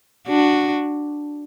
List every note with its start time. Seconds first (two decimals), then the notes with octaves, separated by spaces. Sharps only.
0.28 D4 F#4